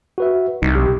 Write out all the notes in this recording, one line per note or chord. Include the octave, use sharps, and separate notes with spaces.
F#4 B4 E5
C2 D#4
B1 G4